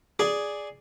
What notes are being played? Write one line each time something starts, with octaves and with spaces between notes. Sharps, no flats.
G#4 D5 G#5